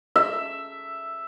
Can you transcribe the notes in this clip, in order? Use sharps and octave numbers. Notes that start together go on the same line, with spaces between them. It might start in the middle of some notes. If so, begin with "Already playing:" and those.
E5